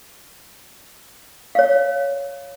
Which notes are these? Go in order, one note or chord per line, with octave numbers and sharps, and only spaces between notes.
C#5 F5